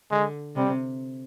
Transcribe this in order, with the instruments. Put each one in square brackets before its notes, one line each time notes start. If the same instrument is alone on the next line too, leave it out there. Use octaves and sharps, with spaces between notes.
[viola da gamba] D3 [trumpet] G#3
[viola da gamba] C3 [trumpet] G3